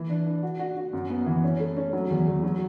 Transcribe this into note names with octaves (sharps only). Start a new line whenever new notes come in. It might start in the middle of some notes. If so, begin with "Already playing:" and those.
Already playing: E3
D4
D4
F#4
F#4
F#4
F#2
B3
E3
C#4
A3
C#4
F#3
E2
E2
F#3